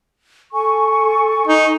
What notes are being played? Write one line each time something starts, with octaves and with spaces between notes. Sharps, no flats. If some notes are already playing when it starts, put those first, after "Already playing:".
A4 G#5 C#6
D#4